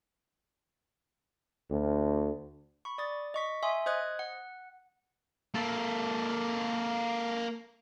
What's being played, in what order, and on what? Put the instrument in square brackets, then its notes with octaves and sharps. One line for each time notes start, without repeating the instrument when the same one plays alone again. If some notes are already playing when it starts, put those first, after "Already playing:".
[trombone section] D2
[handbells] B5 C#6
D5 D#6 A6
D#5 C#6 B6
E5 G#5 C6 D#6
C5 D#5 D#6 F#6 G#6
F#5
[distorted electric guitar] A#3 A4